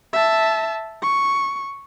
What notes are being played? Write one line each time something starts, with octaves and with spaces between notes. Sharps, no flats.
E5 A5
C#6